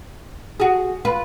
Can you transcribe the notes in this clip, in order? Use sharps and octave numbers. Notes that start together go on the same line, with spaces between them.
F#4 G#4
F4 B4